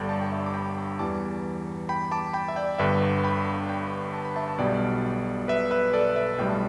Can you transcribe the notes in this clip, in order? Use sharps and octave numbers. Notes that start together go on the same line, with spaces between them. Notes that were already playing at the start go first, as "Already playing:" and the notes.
Already playing: G1 G2 G3 A4 D5 G5
A5
G5
E5 A5
D6
G5 B5
E2 E3 G3 A5 D6
G5 B5
A5 D6
G5 B5
E5
D5 G5
G1 G2 D3 B4 E5
G5 B5
G5 B5
A5
B5
E5 A5
A5
B1 B2 G3 D5 G5
B4 E5
B4 E5
A4 D5
B4 E5
B1 A2 G3 G5
A5